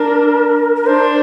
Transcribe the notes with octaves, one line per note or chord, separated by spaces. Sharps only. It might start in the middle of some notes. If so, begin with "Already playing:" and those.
Already playing: D4 A#4
A#4
D4 C5